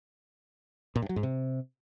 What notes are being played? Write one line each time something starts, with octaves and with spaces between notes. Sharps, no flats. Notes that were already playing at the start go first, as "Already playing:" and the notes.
A#2
G2
F#3
G#2
C3